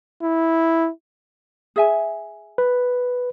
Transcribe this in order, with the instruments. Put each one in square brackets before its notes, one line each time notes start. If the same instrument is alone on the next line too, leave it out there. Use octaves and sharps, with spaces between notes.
[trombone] E4
[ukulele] G#4 E5 G#5
[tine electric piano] B4